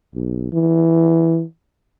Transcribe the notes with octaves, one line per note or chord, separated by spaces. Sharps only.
B1
E3